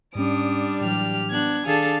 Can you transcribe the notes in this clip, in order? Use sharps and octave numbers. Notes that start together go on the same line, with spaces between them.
G#2 G3 C#4 D4 D#6 D7
A2 E3 F#3 G4 F6
B3 D4 F#6 G#6
D#3 D4 G#4 A4 F5 A6